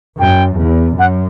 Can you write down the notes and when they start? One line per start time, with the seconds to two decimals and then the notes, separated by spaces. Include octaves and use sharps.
0.19 F#2 G5
0.58 E2
0.98 F#2 F#5